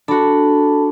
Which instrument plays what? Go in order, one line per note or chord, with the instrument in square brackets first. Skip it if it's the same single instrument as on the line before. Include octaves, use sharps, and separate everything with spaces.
[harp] D4 F#4 [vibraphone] A4 A5 B5